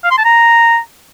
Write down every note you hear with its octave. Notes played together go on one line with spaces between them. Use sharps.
F5
C6
A5
A#5